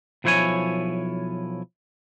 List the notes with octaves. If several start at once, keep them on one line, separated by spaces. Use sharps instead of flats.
B1 F3 E4 C5 C#5 G#5